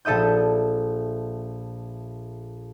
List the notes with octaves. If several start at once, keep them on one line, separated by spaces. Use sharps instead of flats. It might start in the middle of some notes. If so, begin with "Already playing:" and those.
A#1 A4 E5 D#6 G6